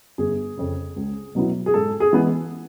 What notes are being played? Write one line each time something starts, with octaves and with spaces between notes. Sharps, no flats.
G1 G#4
F2 C#3
C#2
B2 F#3 B3 E4
G#4
G#2 A4
G#4
E3 G#3 B3